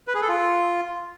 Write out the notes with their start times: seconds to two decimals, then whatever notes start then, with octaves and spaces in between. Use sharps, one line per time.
0.08 B4
0.15 G#4
0.22 A4
0.29 F4